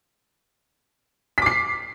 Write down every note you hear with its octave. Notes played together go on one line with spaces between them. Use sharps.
D6 B6 C7